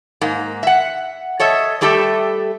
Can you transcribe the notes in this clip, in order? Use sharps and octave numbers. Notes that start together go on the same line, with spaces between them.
G#2 A#3
E5 F#5
A4 C#5 D#5 E5
G3 A3 G4 A4 E5